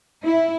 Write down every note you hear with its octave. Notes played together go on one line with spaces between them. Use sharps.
E4